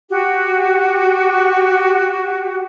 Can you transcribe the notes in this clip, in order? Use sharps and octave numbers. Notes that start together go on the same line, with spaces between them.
F#4 G4